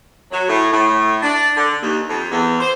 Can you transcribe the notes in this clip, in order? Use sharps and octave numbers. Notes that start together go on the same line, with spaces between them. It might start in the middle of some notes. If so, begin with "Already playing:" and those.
F#3
A2
A2
D4
D3
D#2
F2
E2
C5